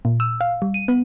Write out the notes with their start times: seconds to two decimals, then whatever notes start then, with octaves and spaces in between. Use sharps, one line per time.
0.05 A#2
0.20 E6
0.41 F5
0.62 G3
0.74 D#7
0.88 B3